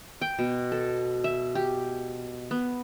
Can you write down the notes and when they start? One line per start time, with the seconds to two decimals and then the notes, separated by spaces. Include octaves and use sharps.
0.21 G5
0.39 B2
0.72 A4
1.24 E5
1.55 G4
2.51 B3